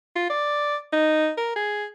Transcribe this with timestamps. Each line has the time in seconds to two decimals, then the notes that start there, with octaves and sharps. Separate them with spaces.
0.16 F4
0.30 D5
0.93 D#4
1.37 A#4
1.56 G#4